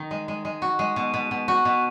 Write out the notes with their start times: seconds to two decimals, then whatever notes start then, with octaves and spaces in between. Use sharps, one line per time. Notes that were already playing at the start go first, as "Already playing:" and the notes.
Already playing: D#3 D#4
0.11 G#3
0.28 G#3
0.45 G#3
0.62 F#4
0.79 G#3
0.96 B2
1.14 B2
1.31 B2
1.48 F#4
1.65 B2